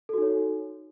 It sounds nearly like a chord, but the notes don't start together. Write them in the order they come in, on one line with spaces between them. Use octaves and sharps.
A4 F#4 D#4 C#5